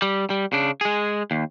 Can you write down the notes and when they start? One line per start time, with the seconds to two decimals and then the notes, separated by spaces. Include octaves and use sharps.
0.02 G3
0.30 G3
0.53 C#3 D4
0.81 G#3 G#4
1.31 D#2